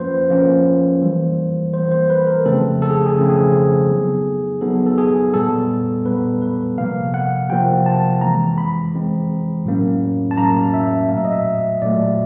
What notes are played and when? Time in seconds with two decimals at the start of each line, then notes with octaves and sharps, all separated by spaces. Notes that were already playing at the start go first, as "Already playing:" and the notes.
Already playing: F3 A#3 C#4 F4 B4 C5
0.30 F3 A#3 C#4 F4
1.02 E3 G3 A#3
1.73 E3 G3 A#3 C5
1.91 C5
2.10 B4
2.27 A#4
2.46 C#3 F3 A3 C4 A4
2.82 A4
2.90 G#4
3.06 G#4
3.17 C#3 F3 A3 C4 A4
3.29 G#4
3.52 G#4
3.89 F#3 B3 D#4
4.61 F#3 B3 D#4 A4
4.86 A4
4.98 G#4
5.34 A#2 G3 B3 A4
6.06 A#2 G3 B3 B4
6.42 B4
6.78 C3 F3 A#3 F5
7.14 F#5
7.49 C3 F3 A#3 G5
7.86 A5
8.21 E3 G#3 C4 A#5
8.58 B5
8.94 E3 G#3 C4
9.66 A2 F#3 A#3 C#4
10.31 A5
10.37 A2 F#3 A#3 C#4 A#5
10.74 E5
11.09 A#2 F#3 A3 F5
11.18 E5
11.25 D#5
11.32 E5
11.82 A#2 F#3 A3 D5